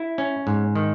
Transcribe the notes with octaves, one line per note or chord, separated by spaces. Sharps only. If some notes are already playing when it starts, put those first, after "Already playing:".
Already playing: E4
C#4
G#2
D#3